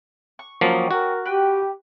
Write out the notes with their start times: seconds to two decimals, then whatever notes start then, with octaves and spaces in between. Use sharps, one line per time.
0.39 C#6
0.61 F3 F#3 A#3 C#4 G5 D#6
0.91 F#4 A#4
1.25 G4 B4 G5